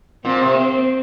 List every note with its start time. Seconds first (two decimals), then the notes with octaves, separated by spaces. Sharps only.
0.24 A#2 C4
0.41 C3
0.57 C4